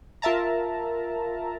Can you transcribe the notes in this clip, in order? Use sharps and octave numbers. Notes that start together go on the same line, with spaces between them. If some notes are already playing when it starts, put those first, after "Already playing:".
F4 A#4 E5 A5 A#5